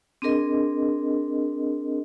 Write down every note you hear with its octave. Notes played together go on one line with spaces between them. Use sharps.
C4 D4 G#4 A#4 D#5